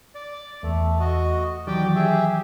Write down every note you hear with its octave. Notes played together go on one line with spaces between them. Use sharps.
D5
E2 A3
F#4 D#5
D#3 E3 F#3 G4 D5 G5
G4 G#4 E5